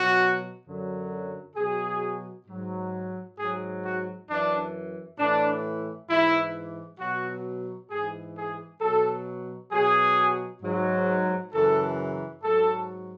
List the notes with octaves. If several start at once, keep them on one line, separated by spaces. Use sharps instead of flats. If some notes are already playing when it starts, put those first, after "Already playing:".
Already playing: B2 F#3 F#4
F#2 D3 F#3
B2 F#3 G#4
G#2 F#3
G#2 F#3 G#4
F#4
F#2 E3 D4
A2 E3 D4
G#2 E3 E4
B2 F#3 F#4
G#2 E3 G#4
G#4
B2 F#3 A4
B2 F#3 G#4
G#2 F#3
F#2 C#3 E3 A4
G#2 F#3 A4